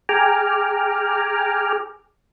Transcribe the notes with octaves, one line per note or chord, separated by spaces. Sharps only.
G#4 G5 G#5 A#5 D6 F6